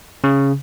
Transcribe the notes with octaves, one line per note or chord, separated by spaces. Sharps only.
C#3